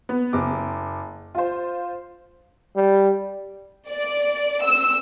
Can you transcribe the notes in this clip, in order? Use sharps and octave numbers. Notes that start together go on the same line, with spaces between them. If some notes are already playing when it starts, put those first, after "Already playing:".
B3
F#1 D6
F4 C5
G3
D5
E6